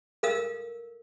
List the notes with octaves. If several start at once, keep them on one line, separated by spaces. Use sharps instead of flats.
A4 A#4 F5 D#6 E6